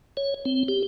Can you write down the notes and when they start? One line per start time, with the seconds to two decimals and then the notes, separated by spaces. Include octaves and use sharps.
0.17 C#5
0.45 C4
0.68 G4